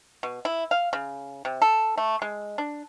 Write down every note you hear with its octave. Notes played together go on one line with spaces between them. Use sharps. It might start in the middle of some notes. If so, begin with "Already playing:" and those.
B2
E4
F5
C#3
C3
A4
A3
G#3
D4